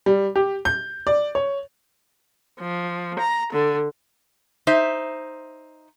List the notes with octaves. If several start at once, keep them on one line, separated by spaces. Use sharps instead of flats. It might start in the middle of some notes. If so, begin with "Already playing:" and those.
G3
G4
G6
D5
C#5
F3
A#5
D3
D#4 C5 E5